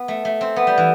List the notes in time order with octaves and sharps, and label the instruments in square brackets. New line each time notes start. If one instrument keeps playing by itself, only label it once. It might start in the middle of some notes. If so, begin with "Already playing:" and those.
Already playing: [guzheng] B3
A3
A3
C4
B3
G3
E3